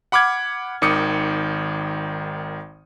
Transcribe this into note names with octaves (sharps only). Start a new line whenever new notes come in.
F#5 B5 D6 F6 G#6
G#1 D#3 D6 D#6 C#7